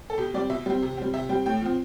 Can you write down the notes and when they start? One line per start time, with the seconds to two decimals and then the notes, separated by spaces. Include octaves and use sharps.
0.10 A4
0.18 B2 G4
0.34 G3 C4 D5
0.50 B2 E5
0.66 G3 C4
0.82 C3
0.97 G3 C4
1.13 C3 E5
1.29 G3 C4 G5
1.46 A2 G5
1.61 F3 C4